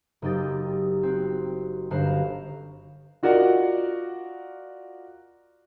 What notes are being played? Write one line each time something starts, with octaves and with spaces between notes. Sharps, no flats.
F#1 D#4 G4 A6
C4 F#4
G1 F#4 C5 F5 A#5 E7
F4 F#4 A#4 D5 D#5 F#5